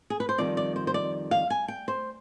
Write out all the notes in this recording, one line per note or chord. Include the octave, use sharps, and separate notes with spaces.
G#4
B4
C5
F2 D#3 G3 D5
D5
C5
C5
D5
F5
G#5
G5
C5